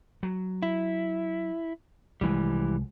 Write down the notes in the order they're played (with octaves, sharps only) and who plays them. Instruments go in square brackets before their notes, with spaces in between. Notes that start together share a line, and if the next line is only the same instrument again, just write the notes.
[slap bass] F#3
[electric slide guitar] E4
[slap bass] C2 F3 G#3 [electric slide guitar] E3 G3